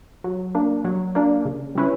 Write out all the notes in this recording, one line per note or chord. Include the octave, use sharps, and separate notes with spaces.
F#3
A#3 D4
F#3
A#3 D4
C#3
G3 C#4 E4 B4